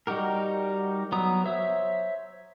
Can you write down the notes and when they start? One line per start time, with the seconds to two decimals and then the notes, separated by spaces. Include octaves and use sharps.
0.07 G3 D#4 F#4 G4 A#4
1.12 F#3 B3 A#5 D#6
1.46 C5 C#5 E5